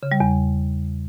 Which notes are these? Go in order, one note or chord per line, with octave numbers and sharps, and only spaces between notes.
C#3
G3
E2